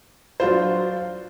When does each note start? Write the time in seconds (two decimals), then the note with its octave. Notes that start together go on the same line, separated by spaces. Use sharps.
0.40 F#3 D4 F4 C5